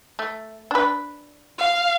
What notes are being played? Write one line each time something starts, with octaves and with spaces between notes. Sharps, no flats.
A3
D4 B4
F5